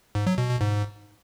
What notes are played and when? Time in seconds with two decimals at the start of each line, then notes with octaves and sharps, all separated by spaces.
0.15 G#2
0.27 F#3
0.38 B2
0.49 B2
0.61 G#2